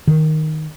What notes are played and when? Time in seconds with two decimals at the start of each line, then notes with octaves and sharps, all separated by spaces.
0.07 D#3